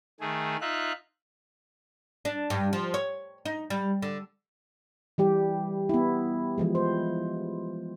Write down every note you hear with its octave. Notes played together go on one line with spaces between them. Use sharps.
D#3 A3 G#4
D#4 F4 E5 F#6
D4
G2
F3
C#5
D#4
G3
D3
E3 G3 G4
B3 E4
E3 F3 G#3
C5